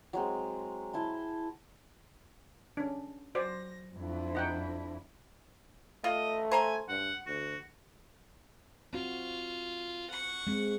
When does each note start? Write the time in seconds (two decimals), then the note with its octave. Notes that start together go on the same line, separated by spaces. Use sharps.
0.13 F#3 G#3 C4
0.93 E4 A5 C6
2.77 C#4 D4
3.35 F#3 F#4 C5 D5 A#6
3.96 F2 D4 E4
4.35 D#4 F#5 G5
6.04 A3 F4 D#5
6.51 C5 G#5 A#5 C6
6.89 G2 F#5
7.26 D2 F#4
8.93 C4 F4 F#4
10.10 F#5 C#6
10.47 G#3 C4